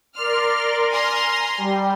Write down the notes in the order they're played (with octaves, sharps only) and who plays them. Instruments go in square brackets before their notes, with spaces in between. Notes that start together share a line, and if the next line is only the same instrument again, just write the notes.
[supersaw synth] A#4 D5 C6 [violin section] F6
[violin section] G#5 A#5 C6 [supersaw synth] F6
[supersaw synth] G3